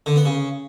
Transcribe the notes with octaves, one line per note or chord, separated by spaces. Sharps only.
D3
B3
C#3